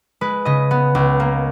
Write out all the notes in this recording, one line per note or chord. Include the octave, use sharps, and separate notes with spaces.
G#3 B4
C#3 D#5
B3
C#2
A#3